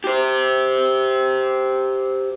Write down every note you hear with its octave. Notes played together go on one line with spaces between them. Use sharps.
G4 C5